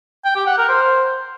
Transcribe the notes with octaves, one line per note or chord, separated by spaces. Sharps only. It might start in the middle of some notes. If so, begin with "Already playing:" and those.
G5
G4
F#5
A#4
C5